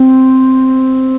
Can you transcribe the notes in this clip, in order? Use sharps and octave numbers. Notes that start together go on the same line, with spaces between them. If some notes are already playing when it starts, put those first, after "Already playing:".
Already playing: C4